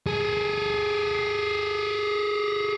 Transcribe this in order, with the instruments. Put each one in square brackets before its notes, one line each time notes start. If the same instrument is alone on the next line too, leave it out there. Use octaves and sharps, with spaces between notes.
[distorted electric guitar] G#4 A4